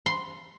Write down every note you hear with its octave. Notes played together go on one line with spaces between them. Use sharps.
C6